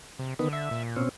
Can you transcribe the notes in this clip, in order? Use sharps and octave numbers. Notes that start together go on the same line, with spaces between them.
C3
D3 D#3 B3
E5
A#2
B2 C4 C#4